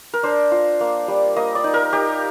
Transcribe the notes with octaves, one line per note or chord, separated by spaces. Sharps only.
A#4
D4 C5
F4
A#3
G3
A#3 D#5
D5
D#4
A#4
D#4 G4